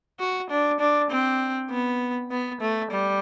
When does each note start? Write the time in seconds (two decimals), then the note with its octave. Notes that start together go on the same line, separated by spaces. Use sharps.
0.20 F#4
0.50 D4
0.80 D4
1.10 C4
1.71 B3
2.31 B3
2.61 A3
2.91 G3